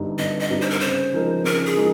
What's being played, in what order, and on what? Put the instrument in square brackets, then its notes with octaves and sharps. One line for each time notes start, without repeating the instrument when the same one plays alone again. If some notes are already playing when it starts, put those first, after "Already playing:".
Already playing: [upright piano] G1 G2 G3 C4 D#4
[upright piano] G1 [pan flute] D#5
[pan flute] D#5
[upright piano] G2 G3 C4 D#4
[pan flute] C5
A#4
[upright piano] C#3 [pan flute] C5
[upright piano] F3 G#3 D#4 A#4
[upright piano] C#3 [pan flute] A#4
[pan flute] G#4
[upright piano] F3 G#3 D#4 A#4